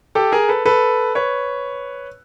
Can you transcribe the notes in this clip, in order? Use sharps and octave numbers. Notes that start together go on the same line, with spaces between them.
G4 A4
G#4 A#4
A4 B4
A4 B4
B4 C#5